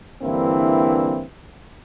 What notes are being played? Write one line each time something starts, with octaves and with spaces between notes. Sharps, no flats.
G2 D3 E3 A#3 C4 E4